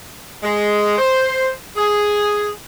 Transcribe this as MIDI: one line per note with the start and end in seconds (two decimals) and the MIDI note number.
0.43 0.97 56
0.98 1.49 72
1.76 2.48 68